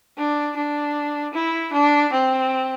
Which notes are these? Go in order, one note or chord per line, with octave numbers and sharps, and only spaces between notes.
D4
D4
E4
D4
C4